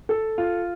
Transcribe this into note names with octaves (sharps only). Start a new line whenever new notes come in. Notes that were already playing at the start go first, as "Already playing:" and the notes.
A4
F4